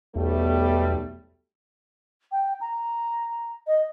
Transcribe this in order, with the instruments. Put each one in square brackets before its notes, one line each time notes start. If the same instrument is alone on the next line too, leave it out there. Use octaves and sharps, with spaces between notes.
[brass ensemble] B1 G3 A3 [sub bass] E2
[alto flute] G5
A#5
D#5